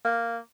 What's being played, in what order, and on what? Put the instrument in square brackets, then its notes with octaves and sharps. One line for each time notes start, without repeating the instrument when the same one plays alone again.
[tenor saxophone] A#3